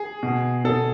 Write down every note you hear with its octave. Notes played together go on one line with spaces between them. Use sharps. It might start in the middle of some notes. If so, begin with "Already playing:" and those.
Already playing: G#4
B2
B2 A4